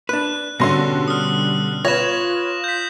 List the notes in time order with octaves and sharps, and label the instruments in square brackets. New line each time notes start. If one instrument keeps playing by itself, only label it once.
[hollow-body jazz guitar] D4 B4 [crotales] F#6
[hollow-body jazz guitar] B2 C#4 [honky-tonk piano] D3 C6 A#6 [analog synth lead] G3
[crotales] D#6 F6
[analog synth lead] F4 [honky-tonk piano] B4 C#5 [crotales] A#6 E7
[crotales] G6 B6